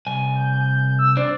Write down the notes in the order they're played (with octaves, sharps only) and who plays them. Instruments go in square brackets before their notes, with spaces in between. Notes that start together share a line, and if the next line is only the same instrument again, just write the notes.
[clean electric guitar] C2 G#5
[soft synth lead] G6
E6
[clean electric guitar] D4 C5 [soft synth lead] D5